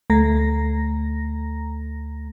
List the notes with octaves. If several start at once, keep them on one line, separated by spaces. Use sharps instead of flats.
D2 A3 A#5 A#6